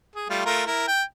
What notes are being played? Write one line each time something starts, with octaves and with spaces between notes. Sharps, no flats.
G#4
G3 A3 F4
A3 F4 A#4
E4 A#4
G5